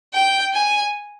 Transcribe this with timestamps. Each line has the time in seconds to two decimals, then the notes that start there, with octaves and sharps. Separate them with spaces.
0.14 G5
0.53 G#5